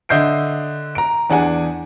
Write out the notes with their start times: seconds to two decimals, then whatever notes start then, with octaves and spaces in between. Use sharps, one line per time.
0.09 D3 D#5 E5 G6 C7 D7
0.95 A#5 D7
1.30 E2 D4 G#4 F#5 G#5